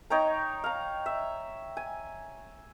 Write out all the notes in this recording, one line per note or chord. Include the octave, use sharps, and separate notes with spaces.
D#4 C#5 G5 A#5
F5 A#5
E5
G#5